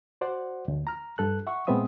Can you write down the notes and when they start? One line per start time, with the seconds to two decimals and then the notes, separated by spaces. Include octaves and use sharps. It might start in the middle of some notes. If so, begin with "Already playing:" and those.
0.21 F#4 C5 D5 F#5
0.68 D2
0.87 A#5 F6
1.18 G2 A4 F#6
1.47 E5 F#5 C#6
1.67 A#2 G#3 B3 C4 E5 D#6